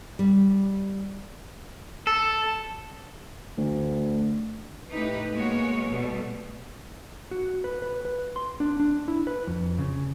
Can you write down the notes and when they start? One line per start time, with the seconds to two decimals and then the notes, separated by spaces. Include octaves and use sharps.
0.19 G3
2.07 A4
3.58 D2
4.91 A2 A3 D#4 G4 B4
5.32 G#3 A#3 B3 F#4 C#5
5.88 B2 G3 A3 B3
7.31 F#4
7.64 B4
7.82 B4
8.05 B4
8.36 C6
8.60 D4
8.80 D4
9.08 E4
9.27 B4
9.47 F2
9.78 C#3